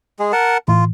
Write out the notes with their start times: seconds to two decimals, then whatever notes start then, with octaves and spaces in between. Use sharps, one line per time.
0.19 G#3 G#4
0.32 A#4 F#5 A5
0.68 A2 E3 F4